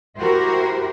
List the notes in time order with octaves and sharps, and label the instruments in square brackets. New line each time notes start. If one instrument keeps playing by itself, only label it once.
[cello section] E4 F#4 G4 A#4 C5